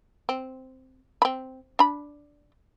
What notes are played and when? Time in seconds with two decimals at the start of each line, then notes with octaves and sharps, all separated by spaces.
0.29 C4
1.22 C4 B5
1.79 D4 B5